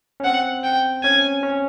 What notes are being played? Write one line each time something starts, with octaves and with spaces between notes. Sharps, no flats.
C#4
C4 F#5
G5
C#4 G#5
C#4